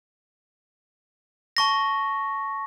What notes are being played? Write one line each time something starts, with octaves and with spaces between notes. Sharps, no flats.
A5 C#6 A#6